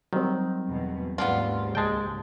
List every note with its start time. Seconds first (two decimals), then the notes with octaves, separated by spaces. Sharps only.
0.13 D#3 F#3 G3 C4
0.68 E2 B2
1.18 D#2 G#2 C#3 B3 D4 F4
1.75 C#2 G#3 G5 A5